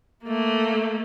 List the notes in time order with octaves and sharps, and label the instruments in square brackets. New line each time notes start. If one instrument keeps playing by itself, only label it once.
[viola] A3 A#3